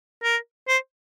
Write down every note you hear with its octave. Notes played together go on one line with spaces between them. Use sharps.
A#4
C5